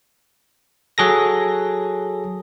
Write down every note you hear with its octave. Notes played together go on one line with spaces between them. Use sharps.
F#3 G#4 A4 A#6